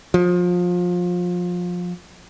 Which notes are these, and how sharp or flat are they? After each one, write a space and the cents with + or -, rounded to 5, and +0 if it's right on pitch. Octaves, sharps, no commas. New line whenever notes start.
F3 +25